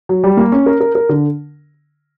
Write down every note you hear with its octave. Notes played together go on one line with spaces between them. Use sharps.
F#3
G3
A#3
C#4
A#4
A#4
A#4
D3